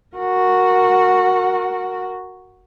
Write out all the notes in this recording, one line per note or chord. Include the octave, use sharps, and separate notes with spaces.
F#4 A#4